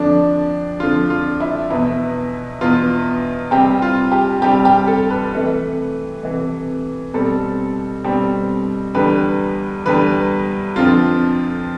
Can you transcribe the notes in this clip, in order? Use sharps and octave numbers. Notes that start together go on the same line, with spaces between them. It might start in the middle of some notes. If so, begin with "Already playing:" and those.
Already playing: F2 D3 F3 D4
F2 D3 F3 F4
F4
E4
E2 B2 B3 E4
E2 B2 B3 F4
C3 G3 C4 G4
F4
G4
C3 G3 C4 G4
G4
A4
B4
C3 E3 A3
C3 E3 A3
B2 G3 C4 A4
B2 G3 C4
E2 D3 G3 B4
E2 D3 G3 B4
F2 D3 F3 C4 F4